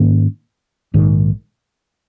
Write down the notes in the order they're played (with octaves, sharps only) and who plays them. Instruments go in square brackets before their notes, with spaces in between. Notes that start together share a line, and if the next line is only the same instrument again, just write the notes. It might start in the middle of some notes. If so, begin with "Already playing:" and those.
Already playing: [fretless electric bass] G#2 D#3 A#3 C#4
A#1 G#2 D#3